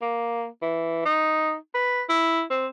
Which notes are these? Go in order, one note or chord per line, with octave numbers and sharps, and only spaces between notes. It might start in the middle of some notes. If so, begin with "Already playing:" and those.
A#3
E3
D#4
B4
E4
C4